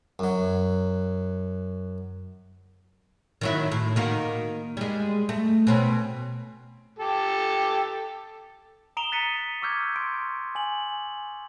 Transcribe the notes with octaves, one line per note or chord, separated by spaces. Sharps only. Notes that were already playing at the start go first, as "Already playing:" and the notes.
F#2 F#3
D#3 F#3 E4
A2
D#3 A#3 F#4
G3 G#3
A3
B2 C4 C#4
G4 A4
A#5 D#6 D7 E7 F7 G7
F#6 A6 B6 C#7 D#7
C#6 D6 E6 F6 G6 G#6
C6 D7
G#5 F#7